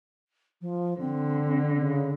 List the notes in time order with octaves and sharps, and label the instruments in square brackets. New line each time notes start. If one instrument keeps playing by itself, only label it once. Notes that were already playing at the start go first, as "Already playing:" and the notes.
[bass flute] F3
[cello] D3 [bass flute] C4
[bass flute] C#3